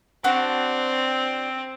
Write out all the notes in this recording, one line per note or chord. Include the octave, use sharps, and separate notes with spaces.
C4 D4 F#4 C#6